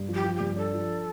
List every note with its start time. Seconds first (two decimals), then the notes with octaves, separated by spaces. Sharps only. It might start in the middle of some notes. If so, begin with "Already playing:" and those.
Already playing: G2
0.09 F3
0.14 G4
0.24 F3
0.36 G2 G4
0.56 D4 A4
0.74 F3